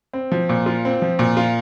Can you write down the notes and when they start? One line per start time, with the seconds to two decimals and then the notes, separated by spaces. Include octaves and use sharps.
0.13 C4
0.32 F3
0.49 A#2
0.66 F4
0.85 C4
1.02 F3
1.19 A#2
1.37 F4